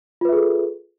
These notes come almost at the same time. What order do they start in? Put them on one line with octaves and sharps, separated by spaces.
F4 B4 E5 G#4 A4